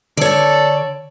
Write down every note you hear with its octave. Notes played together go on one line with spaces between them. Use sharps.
D3 A4 C#5 D5